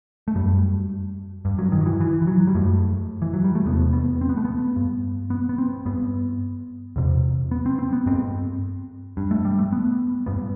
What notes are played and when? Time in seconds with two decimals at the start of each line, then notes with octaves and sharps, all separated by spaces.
0.28 A3
0.35 F#2 G3
1.45 G2
1.58 F#3
1.72 D#3
1.81 F#3
1.86 E3
2.00 E3
2.22 E3
2.27 F#3
2.47 G3
2.55 F#2 A3
3.22 E3
3.33 F#3
3.44 G3
3.55 A3
3.66 E2 C3 B3
3.93 B3
4.21 C4
4.29 B3
4.37 A3
4.45 B3
4.76 G2
5.30 B3
5.49 B3
5.58 C4
5.85 G2 B3
6.96 E2 C3
7.51 B3
7.66 C4
7.79 C4
7.93 B3
8.06 G2 C4
9.17 G2
9.31 A3
9.45 G3
9.59 A3
9.72 B3
10.26 G2 B3